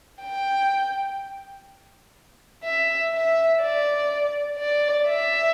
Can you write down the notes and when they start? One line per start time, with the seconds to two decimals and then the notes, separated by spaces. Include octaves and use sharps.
0.21 G5
2.64 E5
3.12 E5
3.61 D5
4.58 D5
5.06 E5